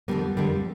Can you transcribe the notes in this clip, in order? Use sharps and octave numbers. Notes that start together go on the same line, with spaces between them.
F2 D3 G3 A#3 B3
F2 D3 G3 A#3